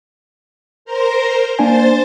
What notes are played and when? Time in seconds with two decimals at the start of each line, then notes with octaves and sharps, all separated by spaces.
0.85 A#4 C5 A#5
1.59 A#3 D4 C5 G#5 A6